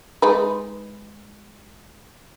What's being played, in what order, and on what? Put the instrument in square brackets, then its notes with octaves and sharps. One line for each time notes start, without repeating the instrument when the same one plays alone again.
[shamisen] G#3 D#4 B4